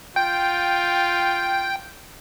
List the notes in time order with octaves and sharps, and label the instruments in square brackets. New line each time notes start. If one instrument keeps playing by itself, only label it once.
[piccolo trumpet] F4 [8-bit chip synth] G5